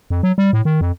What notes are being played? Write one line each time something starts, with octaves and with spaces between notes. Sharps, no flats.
F2
F#3
G3
A2
D#3
F2